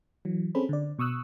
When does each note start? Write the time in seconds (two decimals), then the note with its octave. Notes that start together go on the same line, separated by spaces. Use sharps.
0.25 E3 F#3
0.55 C4 C#4 G#4 A4 C5 B5
0.69 D3 D5
0.99 B2 C#6 D#6 E6 F#6